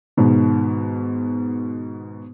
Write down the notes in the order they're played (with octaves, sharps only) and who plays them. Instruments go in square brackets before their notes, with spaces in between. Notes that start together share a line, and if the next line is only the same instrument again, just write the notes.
[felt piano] G#2 B2 D#3